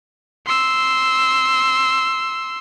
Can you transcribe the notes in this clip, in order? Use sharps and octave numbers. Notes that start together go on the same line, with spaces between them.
C6 E6